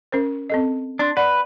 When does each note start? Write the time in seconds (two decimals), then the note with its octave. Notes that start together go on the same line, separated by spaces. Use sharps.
0.12 C#4 A#4 C5
0.50 C4 A4 D#5
0.99 D4 D5 C6
1.17 B4 D5 F#5